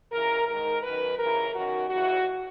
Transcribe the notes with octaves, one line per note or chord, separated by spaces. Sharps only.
D#2 C#3 E3 A#4
G#2 D#3 A#4
F#2 D#3 B4
D#2 C#3 E3 A#4
F#2 D#3 F#4
D#2 C#3 E3 F#4